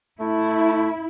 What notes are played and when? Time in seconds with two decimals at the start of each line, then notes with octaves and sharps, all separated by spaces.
0.21 A3 E4